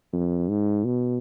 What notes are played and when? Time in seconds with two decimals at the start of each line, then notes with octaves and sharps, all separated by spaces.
0.13 F2
0.49 G#2
0.84 B2